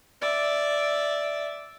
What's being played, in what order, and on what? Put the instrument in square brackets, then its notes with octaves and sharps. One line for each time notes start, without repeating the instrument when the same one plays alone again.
[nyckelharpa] D5 E5